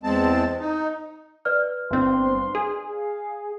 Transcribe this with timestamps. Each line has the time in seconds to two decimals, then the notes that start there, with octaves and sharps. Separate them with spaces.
0.03 E2 G#3 C4 A5
0.60 D#4
1.45 B4 D5 F6
1.91 G1 C4 D4 F5 C6
2.55 G#4
2.92 F5